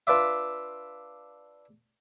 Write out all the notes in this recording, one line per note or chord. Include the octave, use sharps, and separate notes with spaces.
D4 F4 B4 D5 E5